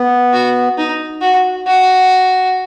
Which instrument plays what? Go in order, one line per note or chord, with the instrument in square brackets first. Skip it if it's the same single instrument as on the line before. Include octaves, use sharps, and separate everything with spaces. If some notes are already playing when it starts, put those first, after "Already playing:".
Already playing: [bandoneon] B3
[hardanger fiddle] F#4
D#4
F#4
F#4